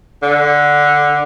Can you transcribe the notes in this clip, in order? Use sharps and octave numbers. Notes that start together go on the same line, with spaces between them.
D3